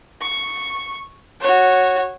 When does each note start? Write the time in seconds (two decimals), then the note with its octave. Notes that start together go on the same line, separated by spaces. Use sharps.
0.22 C#6
1.41 F#4 C#5